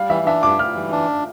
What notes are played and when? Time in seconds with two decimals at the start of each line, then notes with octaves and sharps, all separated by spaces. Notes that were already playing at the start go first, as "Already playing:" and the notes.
Already playing: G3 F5
0.10 E3 E5
0.26 D4 E5
0.43 G2 D6
0.59 G3 F6
0.75 E3
0.92 D4